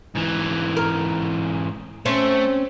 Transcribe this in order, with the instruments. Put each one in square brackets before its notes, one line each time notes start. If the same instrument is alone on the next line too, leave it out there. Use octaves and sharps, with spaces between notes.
[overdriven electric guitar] G#2 E3
[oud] A#4
[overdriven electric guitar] A3 [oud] C4 C#4